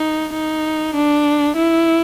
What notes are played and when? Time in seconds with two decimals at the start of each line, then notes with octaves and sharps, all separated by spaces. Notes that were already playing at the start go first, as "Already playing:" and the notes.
Already playing: D#4
0.34 D#4
0.95 D4
1.56 E4